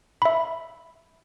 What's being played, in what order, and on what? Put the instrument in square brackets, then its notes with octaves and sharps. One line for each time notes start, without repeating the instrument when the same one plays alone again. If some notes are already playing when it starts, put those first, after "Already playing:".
[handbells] E5 B5